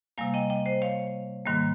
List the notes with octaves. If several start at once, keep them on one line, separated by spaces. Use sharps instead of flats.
C3 G3 A#3 F5 G#5
D#5 G5
D#5 G5
C5 D#5
C#5 F5
G#2 D#3 G3 A#3